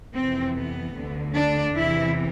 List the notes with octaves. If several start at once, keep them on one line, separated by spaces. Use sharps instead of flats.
F2 C3 E3 C4
B3
D2 D3
D4
E2 C3 E3 E4